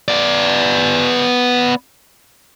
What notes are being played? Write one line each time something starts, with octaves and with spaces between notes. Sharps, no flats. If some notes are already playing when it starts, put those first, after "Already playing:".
B3 D5